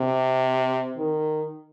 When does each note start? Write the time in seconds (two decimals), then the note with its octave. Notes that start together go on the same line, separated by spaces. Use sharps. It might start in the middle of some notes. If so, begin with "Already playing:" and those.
Already playing: C3
0.98 D#3